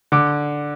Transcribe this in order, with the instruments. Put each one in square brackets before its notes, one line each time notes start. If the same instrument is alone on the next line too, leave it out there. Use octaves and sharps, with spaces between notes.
[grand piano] D3 D6